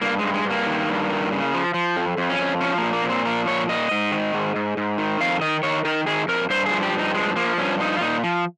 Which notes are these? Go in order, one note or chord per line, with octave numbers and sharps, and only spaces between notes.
G2 A#3
G2 G#3
G#3
G2
A#3
D#3
G2
D#3
C#3
F3
F3
F2
F2
C#4
F2
F3 C#4
A#2 A#3
A#3
A#2 C4
F3 A#4
A#2 C#5
A#2 D#5
G#2
D#3
G#2
G#2
G#2
D#3
F2 F5
D#3 D#5
D#3 C#5
D#3 A#4
D#3 G#4
F2 A#4
G2 C5
G#4
F3
G4
G2
D#4
F3 G#3
F3 A#3
G2 C#4
F3 D#4
F4
A#2 D#4
F3